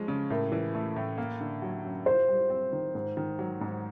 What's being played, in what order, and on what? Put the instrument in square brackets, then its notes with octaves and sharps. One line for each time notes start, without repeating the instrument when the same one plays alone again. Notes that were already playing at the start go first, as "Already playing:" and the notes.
Already playing: [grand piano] F3 G#3 C#4
C#3
[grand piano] A2 [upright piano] A#4
[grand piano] E3
A3
A2
A#3
D3
F#3
F#2
[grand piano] F4 [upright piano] C5
[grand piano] G3
C4
D#3
G#2
D#3
F#3
G#2